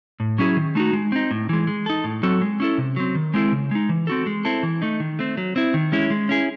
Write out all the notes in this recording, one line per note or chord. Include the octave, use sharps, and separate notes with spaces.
A2
F#3 C#4 E4 G#4
D#3
A3 D#4 F#4
G#3
C4 D#4
A2
E3 G#3
G#3
D#4 A4
A2
F#3 C4 F#4 A4
G#3
C#4 E4 A4
C3
F#3 C4
D#3
G#3 C4 E4 A4
C#3
G#3 D#4
E3
C4 F#4 A4
G#3
C4 E4 A4
E3
A3 D#4
D#3
A3 C4
F#3
C4 E4
D#3
G#3 C#4 E4
G#3
C#4 E4 G#4